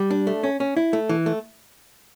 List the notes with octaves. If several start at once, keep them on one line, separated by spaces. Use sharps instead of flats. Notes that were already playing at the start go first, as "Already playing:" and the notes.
Already playing: G3
D4
A3
C#4
C#4
E4
A3
E3
A3